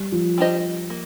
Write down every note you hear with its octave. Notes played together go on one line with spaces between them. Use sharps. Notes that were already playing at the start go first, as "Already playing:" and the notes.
Already playing: G3
F3
G3 D4 G4 C5 D#5
A#3